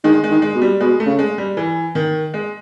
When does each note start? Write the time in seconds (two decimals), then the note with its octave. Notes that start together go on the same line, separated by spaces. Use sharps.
0.04 D#3 G#3
0.24 G#3
0.30 D#3
0.42 G#3
0.55 B2
0.61 G3
0.80 B2 G#3
1.00 A3
1.06 C#3
1.19 G#3
1.38 G3
1.57 E3
1.95 D#3
2.34 G#3